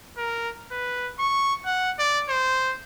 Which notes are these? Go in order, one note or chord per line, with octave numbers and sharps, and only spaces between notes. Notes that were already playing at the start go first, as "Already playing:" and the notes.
A#4
B4
C#6
F#5
D5
C5